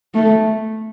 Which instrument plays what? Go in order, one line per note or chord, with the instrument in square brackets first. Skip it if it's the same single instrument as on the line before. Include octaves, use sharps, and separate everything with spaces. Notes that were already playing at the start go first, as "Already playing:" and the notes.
[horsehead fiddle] A3